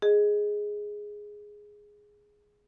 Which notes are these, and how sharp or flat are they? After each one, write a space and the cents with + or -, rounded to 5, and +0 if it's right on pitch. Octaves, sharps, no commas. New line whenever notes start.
G#4 +0 D#5 +0